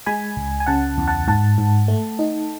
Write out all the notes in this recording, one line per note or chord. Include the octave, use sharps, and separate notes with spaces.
G#3 G#5 B5
C#2
G#5
C#3 F#5 A5
E2
F#5 A5
G#2 F#5 A5
G#2
A3
D#4